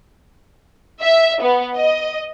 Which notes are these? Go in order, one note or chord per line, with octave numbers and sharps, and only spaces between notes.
E5
B3
D#5